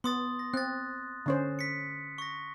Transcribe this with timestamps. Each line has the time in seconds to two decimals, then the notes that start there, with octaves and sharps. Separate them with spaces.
0.04 B3 C6 D#6 A6
0.39 A#6
0.54 C4 F#6 A6
1.26 D3 C#4 C5
1.59 B6 C#7
2.18 C#6 A#6